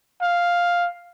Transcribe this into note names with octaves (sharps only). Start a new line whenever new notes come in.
F5